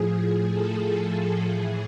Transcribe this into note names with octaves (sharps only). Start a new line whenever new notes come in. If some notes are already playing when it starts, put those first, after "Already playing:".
Already playing: A2 F3 G#4
A4
G#4
A2 E3 G#4